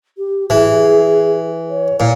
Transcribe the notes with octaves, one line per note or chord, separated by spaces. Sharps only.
G4
E3 G#4
C#5
A#2 E4